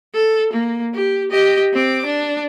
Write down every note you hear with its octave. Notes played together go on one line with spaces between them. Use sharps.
A4
A#3
G4
G4 D#5
C4 D6
D4